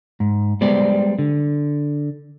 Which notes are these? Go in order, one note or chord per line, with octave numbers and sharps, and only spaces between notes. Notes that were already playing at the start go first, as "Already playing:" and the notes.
G#2
G3 G#3 B3 C5 D5
D3